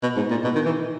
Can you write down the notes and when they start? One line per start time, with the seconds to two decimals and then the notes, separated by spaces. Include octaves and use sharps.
0.03 B2
0.16 G#2
0.31 A#2
0.44 B2
0.55 D#3
0.65 E3